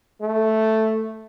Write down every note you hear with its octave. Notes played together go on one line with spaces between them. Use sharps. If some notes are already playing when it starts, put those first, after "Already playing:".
A3